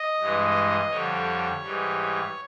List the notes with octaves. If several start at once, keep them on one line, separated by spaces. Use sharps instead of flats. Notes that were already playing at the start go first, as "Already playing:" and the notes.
Already playing: D#5
G2 E3 G#3
F2 D3 G3 C#5
G#2 E3 G3